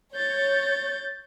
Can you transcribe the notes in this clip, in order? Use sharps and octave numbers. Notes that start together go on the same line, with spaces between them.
C#5 G6 A6